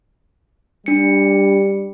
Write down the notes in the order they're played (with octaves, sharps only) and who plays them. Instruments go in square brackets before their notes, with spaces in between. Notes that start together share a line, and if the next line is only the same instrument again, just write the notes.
[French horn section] G3 [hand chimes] D4 C#7